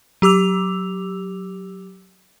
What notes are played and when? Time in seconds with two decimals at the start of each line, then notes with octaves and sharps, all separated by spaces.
0.22 F#3 G4 D6 E6 F7